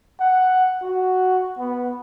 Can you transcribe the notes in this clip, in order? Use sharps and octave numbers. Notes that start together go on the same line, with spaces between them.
F#5
F#4
B3